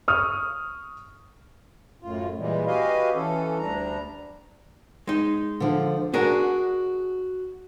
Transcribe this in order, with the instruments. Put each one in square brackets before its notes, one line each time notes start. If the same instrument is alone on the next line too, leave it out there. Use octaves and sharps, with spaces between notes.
[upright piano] C#6 D#6 F6
[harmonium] F#2 A2 F4
A#2 E3 G3 G#3
F#4 G4 B4 D#5 F5 G#5
E3 C#4 A4
D2 G3 D4 A#5
[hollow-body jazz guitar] G#3 D#4
[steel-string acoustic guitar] D3 F3
[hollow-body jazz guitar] D4 G#4 A#4 [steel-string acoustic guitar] F#4